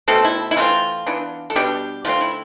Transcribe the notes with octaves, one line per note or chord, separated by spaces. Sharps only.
B2 A3 C4 A4
E4
E4
E3 A3 C4 F4
E3 B3 D4
A4
B2 G3 B3 D4 G4
D3 A3 C4 F4
E4